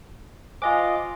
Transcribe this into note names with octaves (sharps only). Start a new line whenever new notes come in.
F4 C5 D#5 G5 G#5 D6